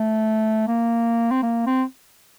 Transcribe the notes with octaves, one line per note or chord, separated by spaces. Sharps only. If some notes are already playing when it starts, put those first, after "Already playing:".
Already playing: A3
A#3
C4
A#3
C4